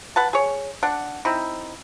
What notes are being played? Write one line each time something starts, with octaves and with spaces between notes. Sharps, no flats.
B4 F#5 A5
G#4 C#5
D4 F#5
C4 D#4 E4